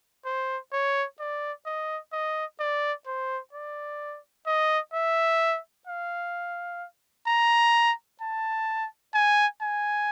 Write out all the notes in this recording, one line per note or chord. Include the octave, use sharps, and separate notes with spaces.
C5
C#5
D5
D#5
D#5
D5
C5
D5
D#5
E5
F5
A#5
A5
G#5
G#5